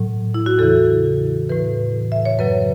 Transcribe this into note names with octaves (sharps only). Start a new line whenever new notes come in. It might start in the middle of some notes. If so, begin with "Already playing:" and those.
Already playing: A2 F#3
E4
F#4
E2 C#3 E3 A4
A2 E3 B4
E5
C#5
F#2 C#3 F#3 B4